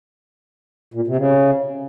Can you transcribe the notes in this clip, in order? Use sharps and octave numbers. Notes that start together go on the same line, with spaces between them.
A#2
C3
C#3